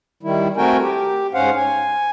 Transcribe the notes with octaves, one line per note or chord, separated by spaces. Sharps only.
D#3 G3 E4
A3 C4 F#4 A#4 G5 G#5
G4
G#2 C#4 C5 F5 F#5
G#5